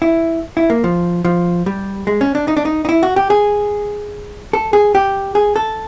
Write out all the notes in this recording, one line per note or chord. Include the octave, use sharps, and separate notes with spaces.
E4
E4
A#3
F3
F3
G3
G#3
C#4
D4
D#4
D4
D#4
D#4
E4
F#4
G4
G#4
A4
G#4
G4
G#4
A4